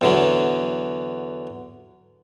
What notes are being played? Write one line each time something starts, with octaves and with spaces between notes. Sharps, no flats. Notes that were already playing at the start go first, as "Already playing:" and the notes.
E2 D3 F#3